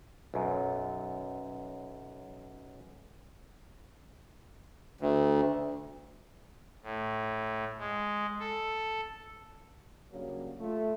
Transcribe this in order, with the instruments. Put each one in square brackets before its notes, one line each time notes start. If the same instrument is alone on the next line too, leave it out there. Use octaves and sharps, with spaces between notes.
[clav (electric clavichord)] B1 F#2
[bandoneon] D2
[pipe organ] A2
G#3
A4
[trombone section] C#3 F#3 G3 A#3 D4
A3 F4